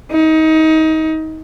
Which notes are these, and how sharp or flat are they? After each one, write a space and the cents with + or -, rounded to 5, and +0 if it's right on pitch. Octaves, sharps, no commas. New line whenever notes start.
D#4 +25